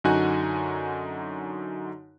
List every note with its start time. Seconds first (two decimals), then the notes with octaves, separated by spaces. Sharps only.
0.04 F#2 D3 D#4 F#4 G#5 F#6